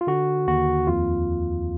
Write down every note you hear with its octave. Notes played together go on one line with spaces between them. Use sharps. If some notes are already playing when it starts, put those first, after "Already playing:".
F4
D3 F#4
D#2 F#4
F2 F4